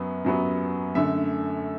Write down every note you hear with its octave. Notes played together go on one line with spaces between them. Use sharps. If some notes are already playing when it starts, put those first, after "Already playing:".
Already playing: F#2 F#3 B3
F#2 F#3 B3
F#2 D3 A3 E5